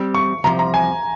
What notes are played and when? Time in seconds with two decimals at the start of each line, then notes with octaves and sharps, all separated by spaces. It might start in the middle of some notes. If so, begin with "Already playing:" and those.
Already playing: G3 C4 G4
0.15 C#6
0.44 C2 C3 F3 A#5
0.59 A#5
0.74 G#5